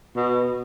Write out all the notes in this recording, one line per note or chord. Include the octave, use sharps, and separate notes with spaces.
B2